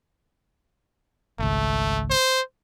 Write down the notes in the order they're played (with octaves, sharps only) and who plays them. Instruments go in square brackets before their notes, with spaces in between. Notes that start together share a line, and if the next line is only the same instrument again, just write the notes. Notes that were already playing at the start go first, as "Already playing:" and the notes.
[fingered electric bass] G#1 C#2 [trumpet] A3
[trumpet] C5